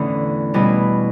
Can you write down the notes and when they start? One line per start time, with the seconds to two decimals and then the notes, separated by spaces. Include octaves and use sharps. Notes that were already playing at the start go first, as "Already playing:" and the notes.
Already playing: E2 A2 D3 A3 C#4 E4
0.54 B2 G3 C#4 E4 B4